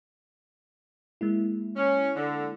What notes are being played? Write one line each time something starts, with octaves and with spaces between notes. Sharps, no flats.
G#3 A#3 E4
C#4
D3